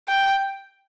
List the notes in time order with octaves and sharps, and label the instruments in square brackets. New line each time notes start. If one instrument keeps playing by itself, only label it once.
[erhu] G5